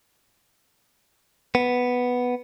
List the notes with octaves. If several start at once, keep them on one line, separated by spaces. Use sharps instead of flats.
B3